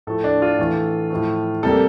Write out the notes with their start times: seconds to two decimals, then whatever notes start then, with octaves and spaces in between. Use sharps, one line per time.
0.07 A2 F3 A3 A4
0.24 D4
0.42 F4
0.58 A2 E3 A3
1.10 A2 F3 A3
1.63 C3 G3 A#3 A4